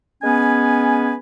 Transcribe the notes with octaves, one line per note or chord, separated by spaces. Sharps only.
G#3 B3 C#4 B4 G#5